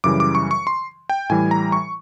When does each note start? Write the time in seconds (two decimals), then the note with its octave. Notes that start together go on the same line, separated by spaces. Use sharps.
0.04 F#2 C#3 E3 G3 D6
0.20 D6
0.35 C#6
0.51 C#6
0.67 C6
1.10 G5
1.30 A2 E3 G3 G#5
1.51 A#5
1.72 C#6